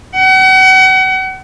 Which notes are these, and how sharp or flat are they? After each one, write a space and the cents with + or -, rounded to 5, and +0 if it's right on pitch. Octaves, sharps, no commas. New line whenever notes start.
F#5 +35